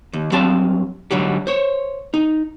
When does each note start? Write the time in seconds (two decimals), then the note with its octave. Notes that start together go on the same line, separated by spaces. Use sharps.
0.13 D#2
0.32 G2 F#3 C4 F5 A5
1.11 G#2 D3 F#3 G3
1.47 C5 C#5
2.14 D#4